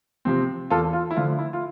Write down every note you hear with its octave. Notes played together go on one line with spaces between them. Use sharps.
C3 F3 C4
E2 F4 A4
F4
E4
D3 F3 A3 F4
E4
F4